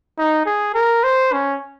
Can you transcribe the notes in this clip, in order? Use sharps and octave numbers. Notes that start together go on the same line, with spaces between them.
D#4
G#4
A#4
C5
C#4